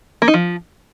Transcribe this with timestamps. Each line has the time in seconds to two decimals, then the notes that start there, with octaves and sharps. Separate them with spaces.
0.22 A#3
0.28 D#4
0.34 F3